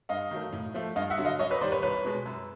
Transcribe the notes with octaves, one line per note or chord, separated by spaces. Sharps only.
G2 D#5 F5
D#3 F#3 A3
A2
F3 A3
G2 D#5 F5
E5 F#5
D3 F#3
D#5 F5
F#2 C#5 D#5
B4 C#5
D#3 G3 C5 D5
B4 C#5
C2 B4 C#5
B2 G#3
F#2